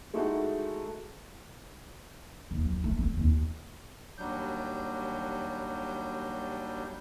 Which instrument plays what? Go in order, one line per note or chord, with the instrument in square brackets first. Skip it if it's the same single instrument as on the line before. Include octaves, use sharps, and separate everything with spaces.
[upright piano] G#3 A3 D#4 E4 F#4
[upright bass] D#2
F#3
A3
C4
D#2
[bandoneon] D#2 F#3 G3 D4 G6